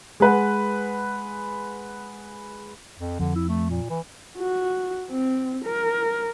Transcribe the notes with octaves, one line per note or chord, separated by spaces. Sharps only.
G#3 B4 F#5
F2
F2 D3
E4
A3
A#2
E3
F#4
C4
A#4